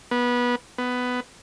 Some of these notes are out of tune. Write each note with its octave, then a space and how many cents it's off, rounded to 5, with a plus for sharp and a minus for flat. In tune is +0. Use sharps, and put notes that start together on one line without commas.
B3 -20
B3 +10